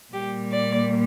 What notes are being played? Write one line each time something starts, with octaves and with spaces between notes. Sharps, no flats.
A#2 G3 A#3 G4
D5